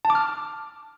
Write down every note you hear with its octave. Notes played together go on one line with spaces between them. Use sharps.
A5
D6
F6